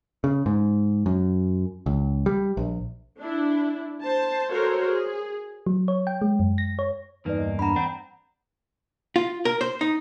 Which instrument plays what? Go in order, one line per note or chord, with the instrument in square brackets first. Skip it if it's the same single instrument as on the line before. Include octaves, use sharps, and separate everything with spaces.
[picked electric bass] C#3
G#2
F#2
C#2
G3
A#1
[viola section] D4 E4
C5 A5
F#4 A4 A#4 C5 C#5
G#4
[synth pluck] F#3
C#5
G5
G#3
F#2
A#6
C#5
[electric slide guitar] E2 G2 A#3 [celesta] D#4 B4 D5
[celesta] D#5
[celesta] D4 F#5 [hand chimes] A#5 B5
[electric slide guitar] C4 D4 [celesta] F#5 G5 G6
[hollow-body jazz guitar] F4
A#4
C5
D#4